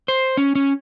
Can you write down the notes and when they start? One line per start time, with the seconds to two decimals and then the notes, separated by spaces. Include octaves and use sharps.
0.08 C5
0.37 C#4
0.55 C#4